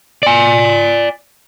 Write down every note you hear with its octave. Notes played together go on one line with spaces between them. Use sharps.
D5 G#5